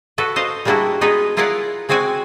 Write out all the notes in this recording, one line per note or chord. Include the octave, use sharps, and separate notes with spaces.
F#4 A4 B4
C5 D#5 F5
G3 G#3 A#3 D4 E4 F#4
G#3 B3 D#4 G#4 B4
E4 F4 G#4 A#4 D5 F#5
G#3 C4 F#4 D5 G#5